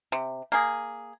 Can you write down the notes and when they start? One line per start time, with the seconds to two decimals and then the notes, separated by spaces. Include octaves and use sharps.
0.12 C3
0.52 A#3 G#4